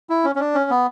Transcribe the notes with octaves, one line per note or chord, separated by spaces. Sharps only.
E4
C#4
C#4
D4
C#4
B3